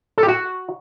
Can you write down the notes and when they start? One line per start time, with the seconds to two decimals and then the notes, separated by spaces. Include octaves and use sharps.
0.18 A4
0.23 G4
0.28 F#4